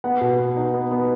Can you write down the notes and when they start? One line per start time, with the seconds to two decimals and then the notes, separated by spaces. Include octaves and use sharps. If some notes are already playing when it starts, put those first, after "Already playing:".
0.04 B3 F#5
0.21 B2
0.38 B3
0.56 D#4
0.74 B3
0.91 B3